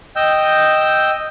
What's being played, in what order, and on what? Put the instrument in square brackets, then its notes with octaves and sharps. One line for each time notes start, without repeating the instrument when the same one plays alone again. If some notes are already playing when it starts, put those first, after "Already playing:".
[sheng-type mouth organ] D#5 G5 E6 G6